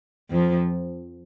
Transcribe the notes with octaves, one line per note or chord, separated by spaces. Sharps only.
F2 F3